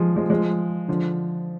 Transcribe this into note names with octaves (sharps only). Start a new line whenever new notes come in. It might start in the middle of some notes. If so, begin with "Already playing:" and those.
Already playing: F3 G#3
F3 G#3
F3 G#3
D3 F3